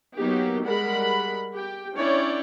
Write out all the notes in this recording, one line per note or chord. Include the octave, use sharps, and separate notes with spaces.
F#3 A#3 B3 D#4 G4
G3 G#3 A#4 F#5 B5
G4 G5
C#4 D4 E4 C#5 D5 G5